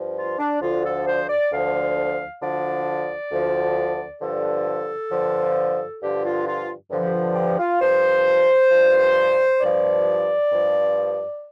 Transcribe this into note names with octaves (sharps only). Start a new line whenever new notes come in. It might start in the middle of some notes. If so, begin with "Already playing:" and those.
Already playing: G2 F3
F4
D4
D2 D3 F3 F4
A4
C5
D5
D2 D3 F3 F5
D2 D3 F3 D5
D2 D3 F3
G2 D3 F3 A4
G2 D3 F3
G2 D3 F3 G4
F4
F4
G2 D3 F3
G4
F4
G4
F4
G2 F3 C5
G2 F3
G2 F3 D5
G2 F3